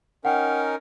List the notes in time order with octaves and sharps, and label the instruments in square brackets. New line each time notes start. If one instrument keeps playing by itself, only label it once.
[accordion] C#4 D#4 A#4 [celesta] F#5 G5